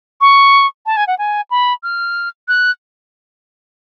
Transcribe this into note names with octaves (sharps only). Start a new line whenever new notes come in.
C#6
A5
G#5
F#5
G#5
B5
F6
F#6